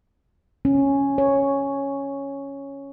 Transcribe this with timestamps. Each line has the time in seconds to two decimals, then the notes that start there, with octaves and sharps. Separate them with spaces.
0.65 C#4
1.18 C#5